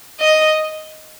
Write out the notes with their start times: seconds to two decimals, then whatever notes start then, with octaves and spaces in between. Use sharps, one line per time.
0.20 D#5